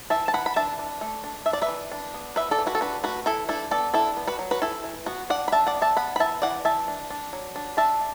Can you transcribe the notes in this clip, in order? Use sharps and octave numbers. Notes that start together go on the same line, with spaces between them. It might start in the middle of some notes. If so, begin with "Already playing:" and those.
E3 E5 A5
A5
E3 F#5 B5
B5
D4 E5 A5
D4
A3
D4
D4 E5
D5
B4 E5
E3
D4
B3
E3 B4 E5
A4 D5
E3
F#4 B4
A4
D4 F#4 B4
A3 F#4 B4
E3 E4 A4
D4 E4 A4
B3 A4 D5
D4 E4 A4
B3
F#4 B4
F#3
F#4 B4
E3 E4 A4
E3
B3 F#4
D4 D5 F#5
B5
D4 E5 A5
D5 F#5
B3
E5 A5
B3 F#5 B5
B5
E3 E5 A5
E3 D5 F#5
E3 E5 A5
D4
D4
F#3
D4
D4 E5 A5